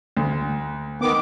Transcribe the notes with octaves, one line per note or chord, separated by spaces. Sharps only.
D2
D#3 B3 D6